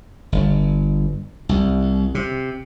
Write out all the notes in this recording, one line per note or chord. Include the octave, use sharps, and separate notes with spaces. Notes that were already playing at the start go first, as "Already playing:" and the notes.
G1
C2
C3